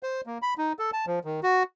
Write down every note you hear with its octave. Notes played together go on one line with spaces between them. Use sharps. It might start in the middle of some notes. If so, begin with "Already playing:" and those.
C5
A#3
B5
D#4
A4
A5
F3
D#3
F#4